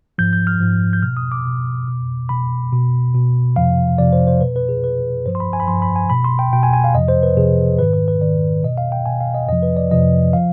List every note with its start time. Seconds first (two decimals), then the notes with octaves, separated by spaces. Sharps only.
0.18 G#2 F3 G6
0.33 G6
0.47 F6
0.60 G#2 F3
0.93 G6
1.02 B2 F6
1.17 D#6
1.32 D6
1.45 B2
1.87 B2
2.29 B2 B5
2.73 B2
3.15 B2
3.56 F2 C3 F3 F5
3.98 F2 C3 F3 D5
4.12 C5
4.27 C5
4.41 B2 B4
4.56 B4
4.69 G#4
4.84 B2 B4
5.25 G2 F3 C5
5.35 C6
5.40 B5
5.53 G#5
5.60 B5
5.68 G2 F3 C6
5.82 B5
5.96 G#5
6.10 B2 B5
6.25 C6
6.39 G5
6.53 B2 G5
6.63 G#5
6.73 G#5
6.84 F5
6.95 F2 C3 F3 D#5
7.08 C5
7.23 B4
7.37 F2 C3 F3 G#4
7.79 G#2 D#3 B4
7.93 B4
8.08 B4
8.21 G#2 D#3 D5
8.63 B2 D#5
8.78 F5
8.92 G5
9.06 B2 G#5
9.21 F5
9.34 D#5
9.48 F2 C3 F3 D#5
9.63 B4
9.77 D5
9.91 F2 C3 F3 D#5
10.33 F3 F5